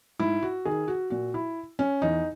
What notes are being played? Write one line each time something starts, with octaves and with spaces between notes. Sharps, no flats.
G#2 E4
F#4
D#3 G#4
F#4
A#2 F#4
E4
C#4
E2 D#4